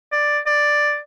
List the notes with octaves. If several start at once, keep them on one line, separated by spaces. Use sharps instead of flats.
D5
D5